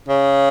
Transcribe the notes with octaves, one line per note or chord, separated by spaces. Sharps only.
C#3